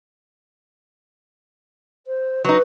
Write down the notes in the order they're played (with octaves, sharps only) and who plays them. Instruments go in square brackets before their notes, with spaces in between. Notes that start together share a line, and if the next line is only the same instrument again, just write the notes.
[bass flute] C5
[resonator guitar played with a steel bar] F#3 D#4 [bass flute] B4